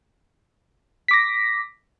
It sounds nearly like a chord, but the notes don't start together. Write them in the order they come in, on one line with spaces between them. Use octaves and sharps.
B6 D6 A#6